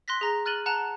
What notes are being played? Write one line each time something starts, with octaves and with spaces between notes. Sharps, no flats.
C6 F#6 A#6 B6
G#4 A#5 A#6
F6 F#6 A6 D#7 F#7 G7
F#5 A5 A#5 F#6 E7 F7